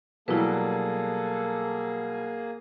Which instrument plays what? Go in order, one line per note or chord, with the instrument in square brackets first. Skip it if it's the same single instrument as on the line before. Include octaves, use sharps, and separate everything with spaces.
[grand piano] B2 F#3 G3 [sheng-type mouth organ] A#3 G#4 [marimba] E4 B4 [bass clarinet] A4